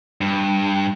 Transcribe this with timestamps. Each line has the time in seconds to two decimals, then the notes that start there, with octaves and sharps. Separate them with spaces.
0.21 G2